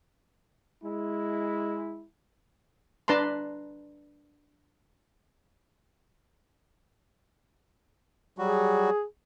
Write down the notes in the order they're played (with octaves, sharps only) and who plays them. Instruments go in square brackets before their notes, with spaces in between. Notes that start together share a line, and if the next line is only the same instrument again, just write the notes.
[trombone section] G#3 E4
[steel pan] D4 B4 A5 A#5 C6
[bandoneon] F#3 G3 F#4 [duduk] G#4